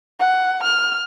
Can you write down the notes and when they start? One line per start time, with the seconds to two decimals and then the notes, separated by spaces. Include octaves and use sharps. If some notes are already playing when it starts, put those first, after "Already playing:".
0.19 F#5
0.63 F6